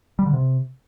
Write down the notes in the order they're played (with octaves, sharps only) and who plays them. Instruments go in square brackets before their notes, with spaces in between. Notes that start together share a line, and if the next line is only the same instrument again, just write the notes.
[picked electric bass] G3
D3
C3